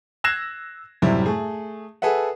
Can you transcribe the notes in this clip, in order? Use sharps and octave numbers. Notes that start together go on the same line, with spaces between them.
E6 F#6 G#6 A#6 C7 E7
F#2 A2 C3 G3 E4
A3 G#4
G#4 A4 B4 E5 F#5